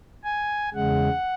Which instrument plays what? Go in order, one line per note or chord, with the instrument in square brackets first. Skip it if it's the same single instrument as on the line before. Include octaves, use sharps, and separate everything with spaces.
[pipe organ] G#5
E2 C#3 G#3 F#5